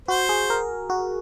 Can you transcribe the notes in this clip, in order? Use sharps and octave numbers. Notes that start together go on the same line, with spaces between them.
F#4 C5
G#4
A#4
F#4